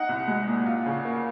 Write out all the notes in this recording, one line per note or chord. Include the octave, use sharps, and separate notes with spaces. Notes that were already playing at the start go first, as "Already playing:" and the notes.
Already playing: D#4 F#5
C2
G#3
A#2
F4
C#3
A#3